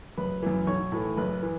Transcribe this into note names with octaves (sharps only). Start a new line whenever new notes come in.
F#1 B4 B5
F#2 E3
B1 C#5 C#6
A2 E3
F#1 B4 B5
E3